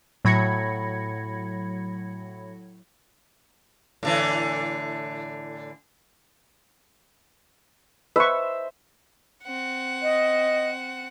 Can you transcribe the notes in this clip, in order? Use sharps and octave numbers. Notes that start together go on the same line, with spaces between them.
A2 F#3 B5 G#6 A#6 C#7
A2 D3 E3
B4 C5 E5 C#6
C4 F#5
D#5